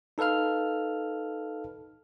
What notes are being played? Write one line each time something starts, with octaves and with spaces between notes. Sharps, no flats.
D#4 A4 B4 F5 F6